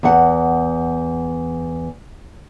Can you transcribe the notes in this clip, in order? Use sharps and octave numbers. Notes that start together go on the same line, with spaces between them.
E2 F#5